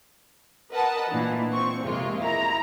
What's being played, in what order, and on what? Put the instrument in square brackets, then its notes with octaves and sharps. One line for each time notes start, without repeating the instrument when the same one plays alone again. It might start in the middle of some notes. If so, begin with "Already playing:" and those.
[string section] A#4 B4 D#5 F#5 A5
A#2 E3 D4
C4 C#6
F2 C3 G#3 A#3 F4
E4 A#5